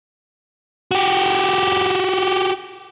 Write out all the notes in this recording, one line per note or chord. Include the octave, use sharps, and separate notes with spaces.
F#4 G4